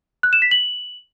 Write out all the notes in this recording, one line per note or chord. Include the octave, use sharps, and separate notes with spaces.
F#6
E7
B6
F#7